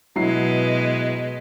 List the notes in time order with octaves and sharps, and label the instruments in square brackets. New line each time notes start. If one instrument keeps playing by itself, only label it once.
[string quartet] B2 G#3 B4 [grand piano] F#3 E4 C7